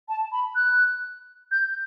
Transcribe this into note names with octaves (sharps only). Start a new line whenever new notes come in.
A5
B5
F#6
G6